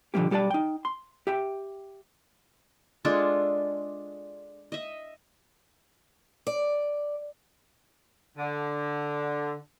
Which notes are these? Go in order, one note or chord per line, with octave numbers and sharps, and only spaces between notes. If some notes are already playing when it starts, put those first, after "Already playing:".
B2 D3 F3 G3 A#3 G4
B1 G3 G4 A4 D5 A5
D#4 G5
C6
G4 E5 G5
G#3 D4 F4 A4
D#5 E5
D5
D3